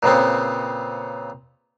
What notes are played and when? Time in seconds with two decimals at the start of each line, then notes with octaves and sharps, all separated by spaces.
0.03 A#2 C#3 B3 C4